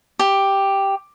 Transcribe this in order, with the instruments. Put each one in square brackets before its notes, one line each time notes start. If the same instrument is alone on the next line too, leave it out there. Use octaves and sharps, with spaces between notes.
[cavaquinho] G4